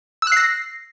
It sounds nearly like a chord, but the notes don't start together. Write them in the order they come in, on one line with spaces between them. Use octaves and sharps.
E6 F#6 C7 A#6